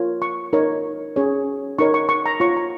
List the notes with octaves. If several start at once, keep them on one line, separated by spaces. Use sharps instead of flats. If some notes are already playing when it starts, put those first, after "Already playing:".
Already playing: F4 A#4 C#5
C#6
D#4 A#4 C#5
C#4 G#4 C#5
D#4 A#4 C#5 C#6
C#6
C#6
A#5
F4 C#5 C#6
A#5